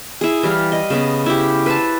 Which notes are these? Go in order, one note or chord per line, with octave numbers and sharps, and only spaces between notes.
E4 G#4
E3 G3 F5
D#5
C#3 B3
E4 G4
B4 C5 A5